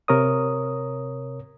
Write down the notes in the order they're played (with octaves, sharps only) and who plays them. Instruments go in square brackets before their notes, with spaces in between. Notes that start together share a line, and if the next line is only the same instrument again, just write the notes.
[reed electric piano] C3 A#4 C#5 D#6